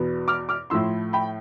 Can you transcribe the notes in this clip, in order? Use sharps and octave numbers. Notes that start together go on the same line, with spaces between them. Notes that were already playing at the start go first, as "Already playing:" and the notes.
Already playing: E2 B2 B3
D6 F6
D6 F6
A2 F3 A3 E4 C6 E6
G5 B5